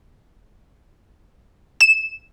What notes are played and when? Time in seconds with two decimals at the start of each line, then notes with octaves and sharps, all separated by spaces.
1.81 E7